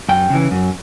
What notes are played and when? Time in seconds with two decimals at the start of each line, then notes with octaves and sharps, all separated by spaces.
0.09 F#2 G5
0.30 C#3 E3
0.51 F#2